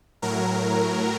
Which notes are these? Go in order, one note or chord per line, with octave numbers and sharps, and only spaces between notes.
A2 F#3 A#4